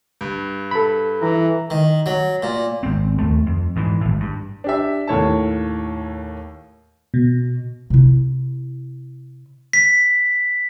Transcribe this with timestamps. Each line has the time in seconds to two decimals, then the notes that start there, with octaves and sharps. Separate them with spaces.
0.21 G2
0.71 A4 B5
1.22 E3 A#5
1.70 D#3
2.06 F#3
2.43 A#2
2.83 G#1 C4
3.18 D#2 A3
3.46 F2
3.76 G#2 E3
4.01 G#1 A2
4.20 G2
4.64 D4 G4 E5
5.07 D#2 A2 C#5 A5
7.14 B2
7.90 C3 E4
9.73 B6